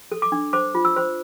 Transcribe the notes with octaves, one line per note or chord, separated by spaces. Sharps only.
A4
D6
D4
C5 D6
F4
E6
C5